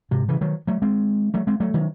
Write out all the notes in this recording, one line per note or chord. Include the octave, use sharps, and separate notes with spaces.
G#2 C3
C#3 E3
D#3 F#3
F#3 A3
G#3 C4
F#3 A3
G#3 C4
F#3 A3
D#3 F#3